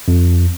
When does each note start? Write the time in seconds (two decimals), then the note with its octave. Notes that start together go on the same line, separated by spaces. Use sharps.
0.08 F2